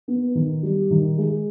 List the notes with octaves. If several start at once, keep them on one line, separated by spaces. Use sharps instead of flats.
B3
D#3
G3
D#3
G#3